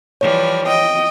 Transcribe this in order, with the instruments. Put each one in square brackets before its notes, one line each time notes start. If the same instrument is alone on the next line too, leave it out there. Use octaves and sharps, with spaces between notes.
[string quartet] E3 F3 G3 [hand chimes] C#5
[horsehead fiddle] D#5 [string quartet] G5